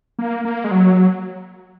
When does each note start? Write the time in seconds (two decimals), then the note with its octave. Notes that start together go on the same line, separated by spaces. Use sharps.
0.19 A#3
0.45 A#3
0.64 G#3
0.71 F#3